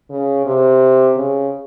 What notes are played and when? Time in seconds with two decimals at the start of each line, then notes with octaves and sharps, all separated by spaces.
0.10 C#3
0.45 C3
1.16 C#3